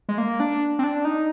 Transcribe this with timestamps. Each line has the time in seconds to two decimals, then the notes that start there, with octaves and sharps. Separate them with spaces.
0.09 G#3
0.18 A#3
0.40 D4
0.79 C4
0.84 D4
1.05 D#4